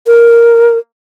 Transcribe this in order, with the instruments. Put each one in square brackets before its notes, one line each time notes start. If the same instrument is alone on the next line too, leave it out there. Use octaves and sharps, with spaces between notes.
[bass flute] A#4